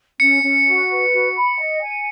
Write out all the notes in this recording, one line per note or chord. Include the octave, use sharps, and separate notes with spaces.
C#4 C#7
C#4
F#4
B4
F#4
B5
D#5
G#5